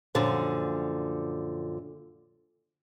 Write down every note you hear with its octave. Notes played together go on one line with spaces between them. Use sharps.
F#2 A#2 D3 F3